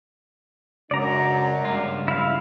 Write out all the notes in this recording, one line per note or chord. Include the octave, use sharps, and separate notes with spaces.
C#2 F#2 F#3 D4 D5 A#5
C#2 G2 F4
E4 F5